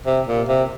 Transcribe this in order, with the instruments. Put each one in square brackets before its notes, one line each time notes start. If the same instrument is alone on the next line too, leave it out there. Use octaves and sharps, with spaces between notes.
[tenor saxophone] C3
A#2
C3